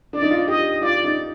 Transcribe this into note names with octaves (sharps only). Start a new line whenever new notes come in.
D4 D5
D#4
F4
G4 D#5
F4 D5
D#4